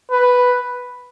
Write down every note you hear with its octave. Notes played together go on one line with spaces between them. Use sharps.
B4